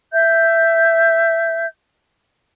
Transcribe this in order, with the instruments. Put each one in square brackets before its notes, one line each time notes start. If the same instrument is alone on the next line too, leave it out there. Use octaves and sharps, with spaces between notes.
[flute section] E5 G6